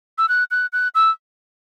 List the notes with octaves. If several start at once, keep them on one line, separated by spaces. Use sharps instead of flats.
E6
F#6
F#6
F#6
E6